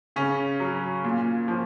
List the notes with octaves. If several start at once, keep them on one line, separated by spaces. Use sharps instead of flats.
C#3 C#4
F#3
A#2
F3